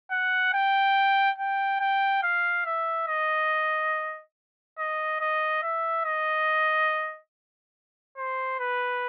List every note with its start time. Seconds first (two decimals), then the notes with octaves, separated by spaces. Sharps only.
0.11 F#5
0.54 G5
1.38 G5
1.80 G5
2.23 F5
2.66 E5
3.08 D#5
4.78 D#5
5.21 D#5
5.62 E5
6.05 D#5
8.17 C5
8.59 B4